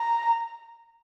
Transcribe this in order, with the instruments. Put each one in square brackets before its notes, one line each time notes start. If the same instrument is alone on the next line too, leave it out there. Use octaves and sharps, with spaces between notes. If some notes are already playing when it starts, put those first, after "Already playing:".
Already playing: [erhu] A#5